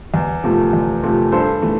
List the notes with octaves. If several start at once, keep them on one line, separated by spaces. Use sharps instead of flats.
E2
C3 F3 A3
E2
C3 F3 A3
G2 A4 C5
E3 A3